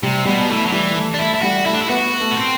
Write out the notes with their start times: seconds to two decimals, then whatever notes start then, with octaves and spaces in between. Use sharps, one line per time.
0.03 C3 G3
0.25 B2 G3
0.50 E3 A3
0.66 F#3
0.72 E3 G3
0.95 A3
1.14 D4
1.19 A3 E4
1.35 E4
1.42 G3 F#4
1.65 A3 E4
1.73 D4
1.80 E4
1.89 B3 F#4
2.21 A3
2.31 B3
2.36 C4